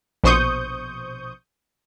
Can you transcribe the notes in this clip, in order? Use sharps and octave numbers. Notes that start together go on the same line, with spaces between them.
A#1 B2 C5 C#6 D#6 G6